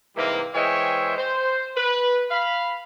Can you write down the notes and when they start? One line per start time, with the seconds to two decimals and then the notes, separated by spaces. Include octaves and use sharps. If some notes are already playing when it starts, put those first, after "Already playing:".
0.16 G#2 C3 E3 G3 A#3
0.54 E3 G#3 C5 C#5 E5 G5
1.17 C5
1.76 B4
2.30 F5 B5